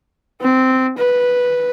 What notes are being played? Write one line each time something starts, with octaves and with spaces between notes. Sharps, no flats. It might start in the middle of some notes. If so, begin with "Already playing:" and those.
C4
B4